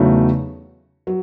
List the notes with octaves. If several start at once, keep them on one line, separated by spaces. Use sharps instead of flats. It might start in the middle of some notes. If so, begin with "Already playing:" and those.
Already playing: E2 C#3 F#3 A3 D#4
F#3